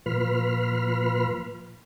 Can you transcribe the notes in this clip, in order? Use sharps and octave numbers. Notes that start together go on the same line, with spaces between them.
A#2 F3 B4 B5 C6 F6